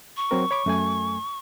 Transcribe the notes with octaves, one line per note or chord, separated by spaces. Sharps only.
C#6
F#3 C4 A#4
C#5 B5 D6
F#2 A3 G#5